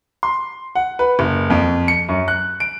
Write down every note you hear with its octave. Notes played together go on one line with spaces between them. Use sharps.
C6
F#5
B4
F#1
F2
C#7
F#2
F#6
D7